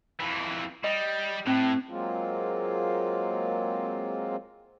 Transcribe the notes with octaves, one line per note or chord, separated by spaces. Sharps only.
F2 E3
G3 D#5
A2 C4
F#3 G#3 A#3 C4 F4